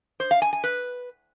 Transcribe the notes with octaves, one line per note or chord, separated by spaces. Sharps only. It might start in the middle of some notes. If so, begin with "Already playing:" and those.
C5
F5
G#5
G#5
B4